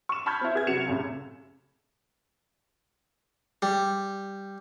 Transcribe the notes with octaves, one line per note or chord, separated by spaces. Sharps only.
C#6 E7
A5 B5 C#6 F6 G6 G#6
C4 E4
G#4 B4 G#6
F#1 C3 F#4 C#7 E7 F7
C#2 F#2 A2 C3
G3